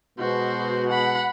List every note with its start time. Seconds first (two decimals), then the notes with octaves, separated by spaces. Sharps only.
0.19 B2 G#3 F#4 C5
0.89 F#5 B5